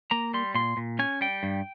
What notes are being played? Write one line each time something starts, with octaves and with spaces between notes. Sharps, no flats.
A#3 A#5
G3 C6
A#2 C6
A#2
C#4 G#5
G3 G5
G2